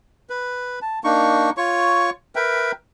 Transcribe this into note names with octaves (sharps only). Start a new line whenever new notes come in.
B4
A5
A#3 D4 D#4 C#6
F4 C#5 C#6
A#4 B4 E5 G5